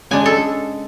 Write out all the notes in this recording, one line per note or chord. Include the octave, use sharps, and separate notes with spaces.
C#3 G#3 D4 G#5
A4